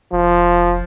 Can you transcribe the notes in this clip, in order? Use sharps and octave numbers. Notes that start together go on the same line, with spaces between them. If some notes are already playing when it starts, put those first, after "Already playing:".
F1 F3